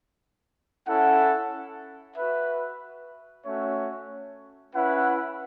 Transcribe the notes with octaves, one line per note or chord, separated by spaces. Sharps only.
C#4 E4 A4 F#5
F#4 B4 E5
A3 C#4 F#4 C#5 E5
C#4 E4 B4 F#5